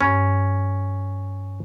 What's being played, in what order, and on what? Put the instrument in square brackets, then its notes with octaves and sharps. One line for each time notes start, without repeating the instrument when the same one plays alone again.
[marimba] G2 [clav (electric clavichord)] C#4